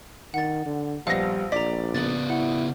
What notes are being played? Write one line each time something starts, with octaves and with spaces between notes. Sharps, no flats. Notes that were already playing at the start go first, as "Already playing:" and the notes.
D#3 F#5 A6
D3
A#1 G3 B3 C5 F5 F#5 A#6
A#1 D5 A#5 B6
C#3 B3 A6 F#7
E4 F#5